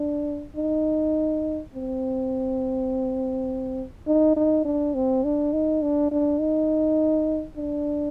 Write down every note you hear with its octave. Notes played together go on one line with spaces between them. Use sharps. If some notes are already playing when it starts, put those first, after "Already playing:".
Already playing: D4
D#4
C4
D#4
D#4
D4
C4
D4
D#4
D4
D4
D#4
D4